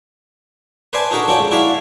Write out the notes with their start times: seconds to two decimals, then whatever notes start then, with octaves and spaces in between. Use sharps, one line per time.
0.93 B4 C5 D5 E5 G#5 A5
1.11 D4 D#4 F#4 A4 A#4
1.28 F2 C#4 F#4 A4 D5 G5
1.39 G#2
1.51 E4 F#4 D5 E5 F5